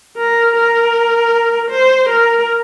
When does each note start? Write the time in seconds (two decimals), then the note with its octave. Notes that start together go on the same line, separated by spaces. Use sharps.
0.17 A#4
0.56 A#4
1.70 C5
2.09 A#4